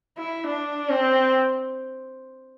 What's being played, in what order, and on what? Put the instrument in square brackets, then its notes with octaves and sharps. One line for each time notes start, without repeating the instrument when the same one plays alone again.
[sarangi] E4
D4
C4